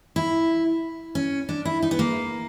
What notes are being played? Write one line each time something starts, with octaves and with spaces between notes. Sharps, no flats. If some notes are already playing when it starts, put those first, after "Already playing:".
E4
C#4
D4
E4
D#4
B3
A#3